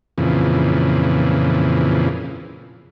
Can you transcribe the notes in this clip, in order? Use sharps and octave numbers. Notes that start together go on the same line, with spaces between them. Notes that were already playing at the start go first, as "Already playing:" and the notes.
F2 A#2 C#3 E3